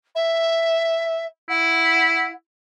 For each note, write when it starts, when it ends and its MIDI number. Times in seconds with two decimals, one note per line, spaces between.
0.15 1.25 76
1.49 2.29 64
1.49 2.32 78